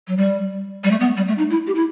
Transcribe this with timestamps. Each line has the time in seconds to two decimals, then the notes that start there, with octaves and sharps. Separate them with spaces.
0.08 F#3
0.17 G3
0.84 G3
0.91 A3
1.00 B3
1.17 G3
1.28 A3
1.38 D#4
1.50 E4
1.67 G4
1.75 E4